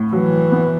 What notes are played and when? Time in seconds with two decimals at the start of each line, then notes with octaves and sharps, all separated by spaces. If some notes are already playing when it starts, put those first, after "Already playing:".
Already playing: A2
0.12 E3 F#3
0.52 B3